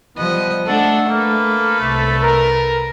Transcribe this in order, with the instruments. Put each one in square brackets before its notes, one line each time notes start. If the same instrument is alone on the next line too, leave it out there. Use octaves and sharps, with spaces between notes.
[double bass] F3 G3 [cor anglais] B3 [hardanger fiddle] D#5
[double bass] A3 [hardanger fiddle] D4 F#5 [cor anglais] A4
[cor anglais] A#3 [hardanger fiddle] A4 B4
[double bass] C2 [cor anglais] A3
[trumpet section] A#4